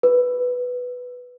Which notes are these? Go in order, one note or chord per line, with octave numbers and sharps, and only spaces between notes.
B4